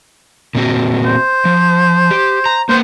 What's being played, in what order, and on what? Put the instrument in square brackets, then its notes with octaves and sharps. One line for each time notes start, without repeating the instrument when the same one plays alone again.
[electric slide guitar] A#2 C4 F#4
[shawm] C5
[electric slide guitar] F3
G4
A#5
[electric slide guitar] A#3 B4 [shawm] C5